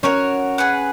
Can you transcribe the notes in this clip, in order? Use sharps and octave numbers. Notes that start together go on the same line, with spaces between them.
C#4 F#4 A#4 C#5
G#4 B4 F#5